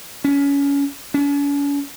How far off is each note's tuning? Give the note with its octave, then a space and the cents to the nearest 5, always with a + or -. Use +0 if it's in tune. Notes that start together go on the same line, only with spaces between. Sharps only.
C#4 +25
C#4 +45